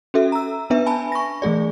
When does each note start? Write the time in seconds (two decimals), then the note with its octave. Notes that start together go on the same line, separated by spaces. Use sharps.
0.14 C#4 F#4 A4 E5
0.32 A#5 E6
0.70 B3 D4 B4 E5
0.86 G#5 A5 B5
1.12 C#6 A#6
1.42 E3 A3 G#4 D5